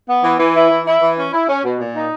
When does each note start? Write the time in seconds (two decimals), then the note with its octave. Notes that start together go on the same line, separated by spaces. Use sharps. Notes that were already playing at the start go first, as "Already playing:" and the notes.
0.08 B3
0.24 E3
0.39 E3
0.55 E4
0.70 E3
0.87 E4
1.02 E3
1.18 C#4
1.33 E4
1.48 C#4
1.64 B2
1.80 A#2
1.95 D#4